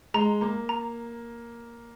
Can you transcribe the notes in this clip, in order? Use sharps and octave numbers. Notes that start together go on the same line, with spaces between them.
G#3 A#5
A#3 A#5
A#5